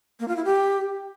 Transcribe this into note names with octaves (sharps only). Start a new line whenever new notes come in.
A#3
F4
E4
G4